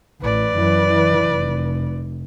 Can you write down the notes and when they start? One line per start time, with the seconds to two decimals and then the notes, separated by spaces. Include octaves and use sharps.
0.22 A1 B4 D5
0.55 F#2 E3
0.89 E3
1.25 F1